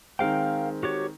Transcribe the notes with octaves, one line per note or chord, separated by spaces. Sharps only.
D#3 G#3 C4 A#4 F5 G5
F#4 G4 C#5